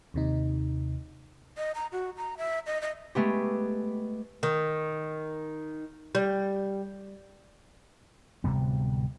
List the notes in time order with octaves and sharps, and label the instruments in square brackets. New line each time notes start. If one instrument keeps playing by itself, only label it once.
[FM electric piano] D#2 C3 D#4
[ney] D#5
A#5
F#4
A#5
E5
D#5
D#5
[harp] G#3 A3 B3 G4
[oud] D#3
G3
[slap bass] D1 C3 G3 B3